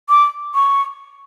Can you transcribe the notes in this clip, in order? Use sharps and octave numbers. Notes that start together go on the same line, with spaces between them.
D6
C#6